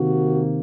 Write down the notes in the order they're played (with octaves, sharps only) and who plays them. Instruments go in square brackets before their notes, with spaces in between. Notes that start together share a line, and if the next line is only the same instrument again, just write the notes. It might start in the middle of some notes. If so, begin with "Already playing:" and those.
Already playing: [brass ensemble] C3 D#3 A#3 F#4